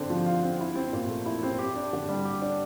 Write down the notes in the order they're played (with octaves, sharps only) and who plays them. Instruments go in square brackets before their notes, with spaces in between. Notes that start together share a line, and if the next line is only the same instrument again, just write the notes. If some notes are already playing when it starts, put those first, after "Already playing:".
Already playing: [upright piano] D3 C4
F3
F4
C4
E4
C4
A#2
A3
E4
C4
G4
D4
D3
G3
G4
D4